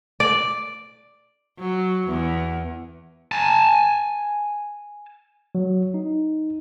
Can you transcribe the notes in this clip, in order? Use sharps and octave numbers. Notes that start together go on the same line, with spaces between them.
D5
F#3
E2
G#5 A5
F#3
D#4